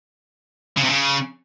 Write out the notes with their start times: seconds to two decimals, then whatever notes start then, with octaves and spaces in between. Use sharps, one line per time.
0.77 C#3
0.83 C3
0.89 C#3